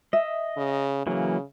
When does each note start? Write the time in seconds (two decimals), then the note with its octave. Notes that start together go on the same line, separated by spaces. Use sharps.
0.13 D#5 E5
0.57 C#3
1.07 C#3 E3 F#3 A#3